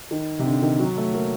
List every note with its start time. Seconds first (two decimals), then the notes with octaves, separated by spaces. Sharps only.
0.11 D#3
0.39 C3
0.45 D3
0.62 D#3
0.79 F#3
0.97 A3
1.14 A#3